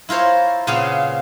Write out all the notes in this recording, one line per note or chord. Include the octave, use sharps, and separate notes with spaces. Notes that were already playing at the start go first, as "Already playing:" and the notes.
E4 F4 A#4 C5 C#5
A#2 C#3 B3 C4 G#4 F5